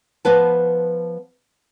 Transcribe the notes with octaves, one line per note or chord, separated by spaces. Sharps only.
F3 B3 B4 A5